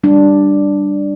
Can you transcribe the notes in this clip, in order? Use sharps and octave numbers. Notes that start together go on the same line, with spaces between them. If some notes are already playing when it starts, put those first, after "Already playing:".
G3 D4